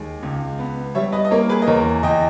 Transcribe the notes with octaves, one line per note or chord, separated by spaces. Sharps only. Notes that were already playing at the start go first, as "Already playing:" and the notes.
Already playing: D#2 G#3
C#2
B3
G3 C#5 E5
B4 D#5
D#5
A#3 A#4 C#5
A#4
G#4 B4
D#5
E2 A#4 C#5
E2 D#5 G5